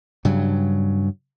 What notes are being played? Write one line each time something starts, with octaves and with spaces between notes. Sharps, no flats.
G2 C#3 F#3